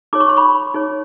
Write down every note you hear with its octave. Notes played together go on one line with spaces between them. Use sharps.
D#4 G#4 C#5 D6
C#6
C6
B5 C#6
D#4 G#4 C#5